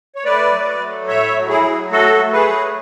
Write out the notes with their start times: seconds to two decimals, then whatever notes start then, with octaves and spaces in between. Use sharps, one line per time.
0.15 C#5
0.24 A3 B4 D5
0.53 F#3
0.80 A3
1.08 A2 C#5 E5
1.36 F#3
1.49 E4 G#4
1.63 F#3
1.91 A3 F#4 A4
2.19 A3
2.33 G#4 B4
2.48 F#3